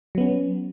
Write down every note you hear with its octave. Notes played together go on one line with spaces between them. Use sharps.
F#3 B3 C#4